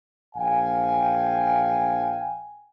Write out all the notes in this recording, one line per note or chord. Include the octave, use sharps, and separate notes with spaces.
A#1 F5 G5 G#5